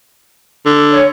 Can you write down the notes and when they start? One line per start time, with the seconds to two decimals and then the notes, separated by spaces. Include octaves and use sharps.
0.66 D3
0.91 C#5